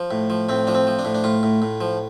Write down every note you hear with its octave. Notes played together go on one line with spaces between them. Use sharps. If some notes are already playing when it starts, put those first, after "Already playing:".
Already playing: F3
A2
F3
A2 C4
F3 D4
C4
F3
D4
A2
D4
A2 F4
A2
A2
F3